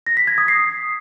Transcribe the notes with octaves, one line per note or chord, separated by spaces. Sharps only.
A#6
B6
G#6
D#6
C7